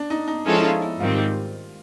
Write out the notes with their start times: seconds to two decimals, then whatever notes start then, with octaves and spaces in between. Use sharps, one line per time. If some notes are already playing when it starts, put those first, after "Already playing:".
Already playing: D4
0.10 D#4
0.28 D#4
0.45 F3 G#3 C#4 E4 F4 A4
0.57 E4
0.63 D#4
0.82 E4
1.00 G#2 D#3 G3 C4 F4